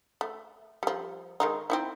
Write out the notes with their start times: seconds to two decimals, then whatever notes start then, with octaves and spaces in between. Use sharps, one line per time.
0.21 A3
0.83 F3 G3
1.40 D#3 G#3 D#4
1.70 C4 D#4 E4